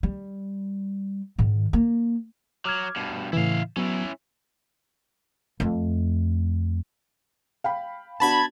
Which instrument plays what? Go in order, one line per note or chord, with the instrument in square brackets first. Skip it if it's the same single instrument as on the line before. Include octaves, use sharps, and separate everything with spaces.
[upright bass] G3
G#2 D#3
A#3
[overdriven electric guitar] F#3 [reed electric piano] D6 F6 G#6
[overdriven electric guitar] G2 B2
[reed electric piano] A2 C#3 E3 [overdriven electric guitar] E4 F5
[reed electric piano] F#3 B3 [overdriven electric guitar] C#4 E4
[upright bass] F2 A3
[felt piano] F5 G5 B5
[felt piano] B3 D4 F#4 [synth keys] A5 B5 G#6